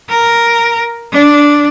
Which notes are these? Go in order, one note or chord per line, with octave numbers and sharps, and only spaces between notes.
A#4
D4